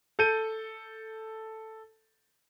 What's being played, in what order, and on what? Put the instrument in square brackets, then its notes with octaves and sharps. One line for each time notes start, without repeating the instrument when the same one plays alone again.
[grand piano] A4 G6 D#7